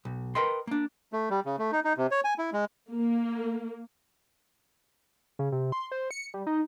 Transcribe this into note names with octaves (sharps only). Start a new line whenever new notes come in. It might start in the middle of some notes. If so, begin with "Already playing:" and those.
B1
A#4 B4 D#5 G5 C6
A#3 D4
A3
G3
C#3
A3
D#4
D#4
C3
C#5
G#5
E4
G#3
A#3
C#3
C3
C6
C5
C#7
G3
D#4